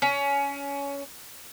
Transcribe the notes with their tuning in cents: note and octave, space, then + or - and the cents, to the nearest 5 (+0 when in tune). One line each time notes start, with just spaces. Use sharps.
C#4 +20